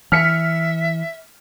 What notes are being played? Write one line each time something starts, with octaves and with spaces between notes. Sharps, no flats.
E3 E5 F6 B6 C#7